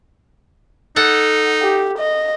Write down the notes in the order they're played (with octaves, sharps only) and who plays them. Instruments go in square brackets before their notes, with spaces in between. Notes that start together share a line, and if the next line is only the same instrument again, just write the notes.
[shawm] D#4 [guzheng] A4 F#5
[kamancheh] G4
D#5